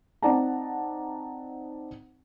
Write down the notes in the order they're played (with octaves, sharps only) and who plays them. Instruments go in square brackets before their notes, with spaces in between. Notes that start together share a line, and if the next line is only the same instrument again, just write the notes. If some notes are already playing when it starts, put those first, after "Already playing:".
[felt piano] C4 D#4 D5 F#5 A5 A#5